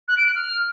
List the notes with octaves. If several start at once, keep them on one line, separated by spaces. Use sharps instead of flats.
F#6
D7
F#6
F6